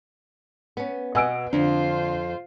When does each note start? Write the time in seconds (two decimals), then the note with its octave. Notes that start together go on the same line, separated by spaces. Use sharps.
0.77 B3 C#4
1.15 B2 D#5 F#5 G#5 E6 D7
1.53 F2 D3 F4 C5